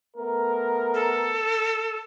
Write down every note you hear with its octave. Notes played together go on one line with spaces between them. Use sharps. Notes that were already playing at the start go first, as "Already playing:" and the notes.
A3 B3 A#4
A4